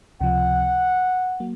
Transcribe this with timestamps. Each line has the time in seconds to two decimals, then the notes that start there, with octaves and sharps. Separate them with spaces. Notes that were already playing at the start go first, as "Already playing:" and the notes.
0.20 C#2 C3 F3 F#5
1.40 F#3 A#3